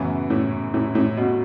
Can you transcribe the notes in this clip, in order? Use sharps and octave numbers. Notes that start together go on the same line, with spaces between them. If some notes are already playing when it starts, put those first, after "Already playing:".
Already playing: F#2 A2 C#3 E3 B3
A2
A2
A2
B2